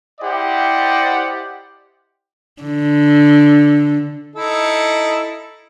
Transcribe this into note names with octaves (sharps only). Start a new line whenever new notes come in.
E4 G4 C5 D5 D#5 F#5
D3
D#4 E4 A4